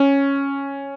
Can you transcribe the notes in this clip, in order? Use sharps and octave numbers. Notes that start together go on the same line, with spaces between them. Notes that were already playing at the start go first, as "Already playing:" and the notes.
Already playing: C#4